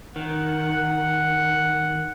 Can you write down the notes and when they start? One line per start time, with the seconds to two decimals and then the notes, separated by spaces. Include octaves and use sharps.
0.16 D#3 F#5